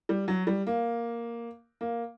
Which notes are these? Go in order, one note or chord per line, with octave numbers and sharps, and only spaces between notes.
G3
F#3
G3
A#3
A#3